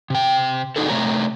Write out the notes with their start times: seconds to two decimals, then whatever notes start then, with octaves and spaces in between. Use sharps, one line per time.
0.10 C3 G5
0.76 D4 D#4 F#4 G#4 A4
0.89 C3 A3 C#5 A#5